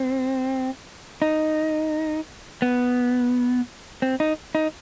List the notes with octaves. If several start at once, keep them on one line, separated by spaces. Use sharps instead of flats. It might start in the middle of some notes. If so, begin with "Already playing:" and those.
Already playing: C4
D#4
B3
C4
D#4
D#4